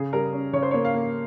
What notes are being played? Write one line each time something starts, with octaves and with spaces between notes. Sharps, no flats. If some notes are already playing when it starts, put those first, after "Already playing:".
Already playing: C#3 G#4
G3 A#4
C#4
C#3 C#5
C5
A#3 C#5
F5
A#3